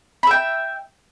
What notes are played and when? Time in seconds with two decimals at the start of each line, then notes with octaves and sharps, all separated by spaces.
0.23 B5
0.27 E5
0.31 G5